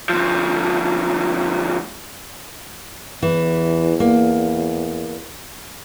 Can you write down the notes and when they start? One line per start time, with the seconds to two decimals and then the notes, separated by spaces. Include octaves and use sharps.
0.09 D2 F3
3.22 E2 E3
4.00 A#3